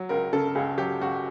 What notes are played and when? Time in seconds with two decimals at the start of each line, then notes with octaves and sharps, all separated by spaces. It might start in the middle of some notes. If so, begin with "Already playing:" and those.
Already playing: F#3
0.09 C#2 A#4
0.33 C#3 A4
0.55 C#2 G#4
0.78 F#3 G4
1.01 C#2 F#4